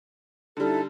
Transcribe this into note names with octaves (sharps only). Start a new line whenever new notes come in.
D3 G3 D#4 E4 A4